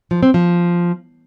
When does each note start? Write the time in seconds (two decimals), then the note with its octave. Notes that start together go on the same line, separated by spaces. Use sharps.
0.11 F3
0.23 C4
0.34 F3